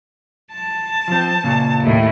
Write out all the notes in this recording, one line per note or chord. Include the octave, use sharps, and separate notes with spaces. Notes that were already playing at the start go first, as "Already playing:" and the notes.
A5
F3 C4
A#2 C#3
D#2 A2